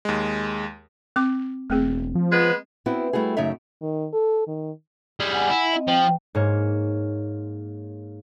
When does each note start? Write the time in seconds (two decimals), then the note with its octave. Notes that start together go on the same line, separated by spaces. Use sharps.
0.05 D#2 G#3
1.16 C4 D6
1.70 E1 A3 C4 G#4
2.15 F3
2.32 G#3 B3 B4
2.86 B3 C4 E4 F#4
3.13 G3 A3 E4 F#4 G#4
3.37 F#2 C#3 A3 D#4 E5
3.81 D#3
4.13 A4
4.47 D#3
5.20 G3 G#4
5.32 F#5 G#5
5.50 E4
5.73 C4 D#5
5.87 F3 G5
6.35 G#2 A#3 C#5